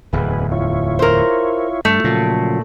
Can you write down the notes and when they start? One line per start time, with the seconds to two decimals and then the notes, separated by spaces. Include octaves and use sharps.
0.13 D1 E2 G#4 B4
0.52 E4 F4 C#5
0.99 A#4 C5
1.85 G2 A3
2.04 A#2 C#3 F3 F#3